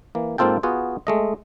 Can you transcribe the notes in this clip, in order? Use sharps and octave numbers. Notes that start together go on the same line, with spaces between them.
E3 A#3
G#2 A#3 C4 F4 A4 G5
B3 F4 F#4 G#4
G#3 A3 D#5